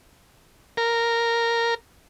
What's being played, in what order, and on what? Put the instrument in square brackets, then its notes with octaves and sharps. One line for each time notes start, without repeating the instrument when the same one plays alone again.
[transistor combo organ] A#4